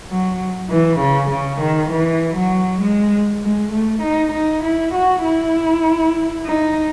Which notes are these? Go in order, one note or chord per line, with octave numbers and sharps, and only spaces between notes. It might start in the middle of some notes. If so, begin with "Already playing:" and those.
F#3
E3
C#3
C#3
D#3
E3
F#3
G#3
G#3
A3
D#4
D#4
E4
F#4
E4
D#4